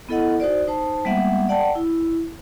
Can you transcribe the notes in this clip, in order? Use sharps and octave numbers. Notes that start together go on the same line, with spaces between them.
B3 E4 A4 D#5 F#5
D#4 F#4 C5 D5
D#4 C5 A5
G3 G#3 A#3 B3 E5 F#5
D5 F#5 G5 A5
E4